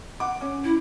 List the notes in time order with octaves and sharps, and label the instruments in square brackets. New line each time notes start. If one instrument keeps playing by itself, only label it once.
[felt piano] F#5 D6
C#4
[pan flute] E4